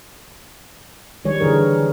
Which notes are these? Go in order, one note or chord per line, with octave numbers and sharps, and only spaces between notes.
D#3 G3 C#5
D3 E3 G#4 A#4